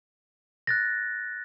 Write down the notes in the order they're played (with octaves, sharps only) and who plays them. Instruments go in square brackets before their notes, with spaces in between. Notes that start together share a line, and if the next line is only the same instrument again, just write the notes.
[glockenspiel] F#6 A6 A#6